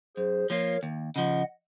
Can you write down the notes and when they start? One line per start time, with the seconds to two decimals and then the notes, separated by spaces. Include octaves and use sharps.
0.17 F#2 G#4 C5
0.50 F3 A#3 F4 A#4 C#5
0.83 D#2
1.16 C#3 F3 D#5 F#5